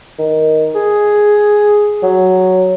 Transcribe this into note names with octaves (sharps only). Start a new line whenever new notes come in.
D#3
G#4
F#3